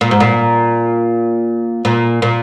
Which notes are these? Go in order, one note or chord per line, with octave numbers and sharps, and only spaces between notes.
A#2
G#2
A#2
A#2
A#2